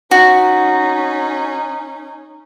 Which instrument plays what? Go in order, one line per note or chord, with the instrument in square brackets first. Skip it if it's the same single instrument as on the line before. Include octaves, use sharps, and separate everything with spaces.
[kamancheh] C#4 D#4 [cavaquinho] F#4